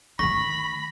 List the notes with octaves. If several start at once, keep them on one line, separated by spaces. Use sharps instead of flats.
D#3 A3 B5 C#6 A#6